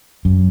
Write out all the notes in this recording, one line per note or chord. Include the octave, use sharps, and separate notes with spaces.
F#2